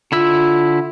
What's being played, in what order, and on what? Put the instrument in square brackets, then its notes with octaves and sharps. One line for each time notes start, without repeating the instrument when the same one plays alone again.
[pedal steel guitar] D3 E4 E6 [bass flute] F4